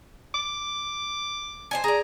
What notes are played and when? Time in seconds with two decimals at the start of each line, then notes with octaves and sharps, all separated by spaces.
0.34 D6
1.71 C5 D5 G#5
1.84 G#4 D5 A#5